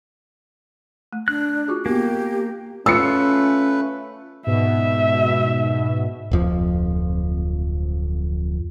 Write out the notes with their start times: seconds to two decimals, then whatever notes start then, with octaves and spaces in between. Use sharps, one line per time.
1.13 A3
1.28 D4 F#6
1.68 F4 F#4 G#4
1.86 A#3 B3 F4 G4
2.86 A3 C#4 F4 B4 E6 C#7
4.47 G#2 B2 E5
6.31 D1 F2 F3